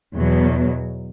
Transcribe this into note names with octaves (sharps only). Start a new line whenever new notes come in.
E2 B2 F#3